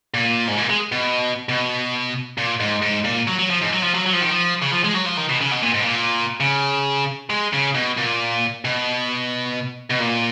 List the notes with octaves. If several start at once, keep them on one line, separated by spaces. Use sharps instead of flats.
A#2
G#2
A#2
G#3
B2
B2
A#2
G#2
G#2
A#2
F#3
F#3
F3
G#2
F#3
F3
F#3
F#3
F3
D#3
F3
C#3
F3
G#3
F#3
F3
D#3
B2
C#3
B2
A#2
G#2
B2
A#2
C#3
G#3
C#3
B2
A#2
B2
B2
A#2